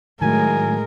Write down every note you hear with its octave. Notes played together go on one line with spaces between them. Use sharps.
A2 D#3 F#3 G#3 A#4 G#5